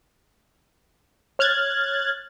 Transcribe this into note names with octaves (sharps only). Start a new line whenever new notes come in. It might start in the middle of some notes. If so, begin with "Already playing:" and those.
C#5 F6 F#6 G#6 A6